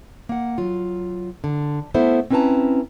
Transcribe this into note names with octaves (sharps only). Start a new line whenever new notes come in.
A#3 F#5
F#3 F4
D3
A3 B3 E4 A4 C5 E5
C4 C#4 E4 B4 A5 A#5